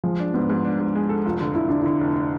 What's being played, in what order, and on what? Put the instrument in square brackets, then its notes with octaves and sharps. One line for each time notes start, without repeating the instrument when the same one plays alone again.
[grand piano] F3 [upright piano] G#3
[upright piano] D4
[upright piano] G#2 [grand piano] B3
[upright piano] G#2
D4
G#2
G#3
A4
[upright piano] F1 [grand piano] F4
[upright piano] D3
[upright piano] D3 [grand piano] E4
[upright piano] D3 [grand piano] D4
[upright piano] D3 [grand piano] E4
[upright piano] F1